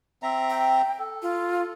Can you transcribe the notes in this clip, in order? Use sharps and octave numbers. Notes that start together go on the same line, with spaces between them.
C4 E5 A#5
G5
A4
F4